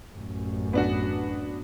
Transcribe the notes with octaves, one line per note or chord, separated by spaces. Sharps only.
A1 F#2
B3 D4 F#4